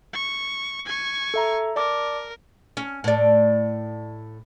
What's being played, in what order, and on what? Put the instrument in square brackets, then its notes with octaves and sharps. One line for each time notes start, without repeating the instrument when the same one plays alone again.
[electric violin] C#6
G#5 C#6
[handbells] A4 E5 A#5
[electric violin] A#4 [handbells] D5 A5 D6
[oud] C#4
A2 D5